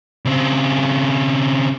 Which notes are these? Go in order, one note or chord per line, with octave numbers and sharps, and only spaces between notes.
C#3 C4